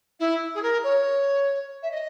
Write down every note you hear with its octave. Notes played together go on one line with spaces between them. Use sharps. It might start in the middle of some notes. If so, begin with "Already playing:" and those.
E4
G#4
A#4
C#5
E5
D#5